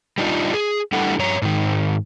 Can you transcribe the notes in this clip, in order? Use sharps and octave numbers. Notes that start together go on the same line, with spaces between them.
G3 D4 D#4 F4
G#4
G3 A3 D4 E4 A4 F#5
G2 C#5 A#5
G#2 D#3